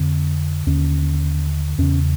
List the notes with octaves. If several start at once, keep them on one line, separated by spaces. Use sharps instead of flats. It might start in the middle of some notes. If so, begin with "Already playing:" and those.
Already playing: F2 D3 C4
D#2 D3 C#4
E2 C#3 C#4